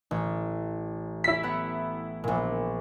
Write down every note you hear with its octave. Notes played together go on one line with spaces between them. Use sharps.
A1
E4 B6
B3 F#5
A#1 A#2